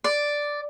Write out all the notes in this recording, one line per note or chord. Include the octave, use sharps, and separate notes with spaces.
D5